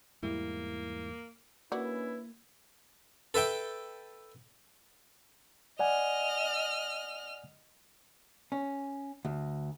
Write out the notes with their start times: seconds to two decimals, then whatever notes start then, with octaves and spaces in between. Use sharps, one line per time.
0.23 E2 G#2 G3 A#3 E4
1.72 A#3 C#4 D4 E4 F#4 B4 D5
3.34 A4 B4 E5 G5
5.79 D5 D#5 F#5 G#5 F6
8.52 C#4
9.25 D2